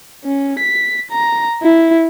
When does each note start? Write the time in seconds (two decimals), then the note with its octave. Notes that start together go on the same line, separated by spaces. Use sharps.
0.25 C#4
0.59 B6
1.11 A#5
1.63 E4